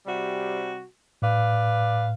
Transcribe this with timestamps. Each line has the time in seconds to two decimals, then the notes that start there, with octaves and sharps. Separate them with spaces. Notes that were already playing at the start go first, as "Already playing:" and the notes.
0.07 C3 G3 F#4
1.22 A2 B4 D5 F5